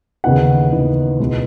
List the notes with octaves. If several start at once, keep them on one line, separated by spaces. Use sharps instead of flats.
D#2 C#3 E3 B3 D#4 F#5
D#2 C#3 E3 B3 D#4
C#2 B2 G#3 B3